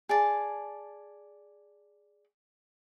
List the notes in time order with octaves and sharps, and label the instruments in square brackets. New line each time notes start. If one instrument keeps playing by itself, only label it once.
[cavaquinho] G#4 D5 A5